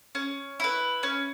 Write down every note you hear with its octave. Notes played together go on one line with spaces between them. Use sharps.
C#4
E4 B4
C#4